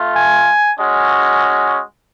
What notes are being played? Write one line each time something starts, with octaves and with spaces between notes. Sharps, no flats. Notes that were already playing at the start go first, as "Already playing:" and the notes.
Already playing: A3 F4
G#5
G#3 C#4 F#4